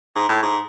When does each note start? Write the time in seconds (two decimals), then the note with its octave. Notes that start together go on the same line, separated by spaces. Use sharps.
0.16 G#2
0.29 A2
0.42 G#2